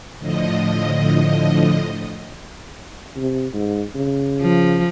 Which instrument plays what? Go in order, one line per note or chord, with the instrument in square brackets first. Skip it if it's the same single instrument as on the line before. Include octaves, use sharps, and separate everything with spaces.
[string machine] A2 D3 F3 D#5
[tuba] C3
G#2
C#3
[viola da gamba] F3